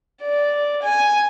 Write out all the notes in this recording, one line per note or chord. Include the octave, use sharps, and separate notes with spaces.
D5
G#5